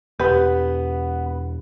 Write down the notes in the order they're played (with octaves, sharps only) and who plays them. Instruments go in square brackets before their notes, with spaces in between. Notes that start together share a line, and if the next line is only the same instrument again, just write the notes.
[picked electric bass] E1 [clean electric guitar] B3 [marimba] G4 [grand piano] B4